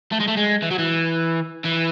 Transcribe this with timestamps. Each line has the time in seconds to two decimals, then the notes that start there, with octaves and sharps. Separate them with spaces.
0.12 A3
0.20 G#3
0.28 A3
0.37 G#3
0.63 E3
0.71 F#3
0.79 E3
1.65 E3